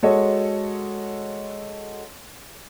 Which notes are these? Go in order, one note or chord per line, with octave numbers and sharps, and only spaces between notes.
G#3 F#4 A4 C#5 D#5